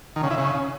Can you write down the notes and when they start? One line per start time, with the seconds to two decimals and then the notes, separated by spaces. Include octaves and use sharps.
0.16 D#3
0.23 C#3
0.31 E4
0.38 C#3